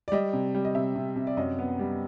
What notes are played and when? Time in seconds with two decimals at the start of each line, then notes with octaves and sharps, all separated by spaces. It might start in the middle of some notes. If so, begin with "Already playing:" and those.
0.08 D5
0.12 G3 D#5
0.33 C3
0.55 G3
0.65 D#5
0.75 C3 E5
0.96 C3
1.16 C3
1.27 D5
1.37 F#2 D#5
1.59 B3
1.79 G3